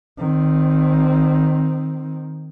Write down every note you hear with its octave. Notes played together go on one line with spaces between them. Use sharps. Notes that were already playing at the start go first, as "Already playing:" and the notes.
D#3 C4